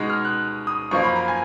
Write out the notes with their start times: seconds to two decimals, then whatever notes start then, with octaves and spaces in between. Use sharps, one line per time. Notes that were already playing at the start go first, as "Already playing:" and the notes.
Already playing: B2 G#3 D#4
0.10 F6
0.25 F#6
0.67 D#6
0.91 F#2 F3 A#3 C#6
1.03 B5
1.16 A#5
1.28 G#5